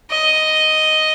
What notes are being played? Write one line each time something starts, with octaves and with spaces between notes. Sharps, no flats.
D#5